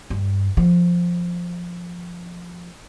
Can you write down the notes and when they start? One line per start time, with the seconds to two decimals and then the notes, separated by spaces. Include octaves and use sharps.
0.10 G2
0.57 F3